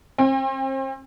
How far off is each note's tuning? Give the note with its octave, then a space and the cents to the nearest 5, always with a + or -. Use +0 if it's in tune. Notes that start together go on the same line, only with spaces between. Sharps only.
C4 +40 G5 +40